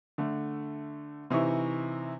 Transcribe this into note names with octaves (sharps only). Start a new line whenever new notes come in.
D3 A3
C3 E3 D#4 E4 C#6